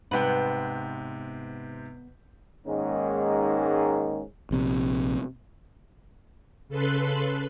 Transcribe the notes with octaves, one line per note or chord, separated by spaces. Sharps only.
G#2 C3 B3 B4 G5
G#2 D#3 G#3 A#3 C#4 D#4
A#1 C3
C#3 A4 B4 C6 F#6